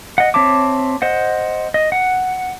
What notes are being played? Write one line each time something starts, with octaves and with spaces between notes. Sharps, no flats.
D#5 F#5
C4 C#5 E5 A5 D6
C5 D#5 F#5
D#5
F#5